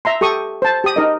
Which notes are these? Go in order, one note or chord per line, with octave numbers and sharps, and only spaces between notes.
E5 A#5 C6
G4 A4 C#6 D#6
C5 A5
G4 D#6
D#4 A#4 D#5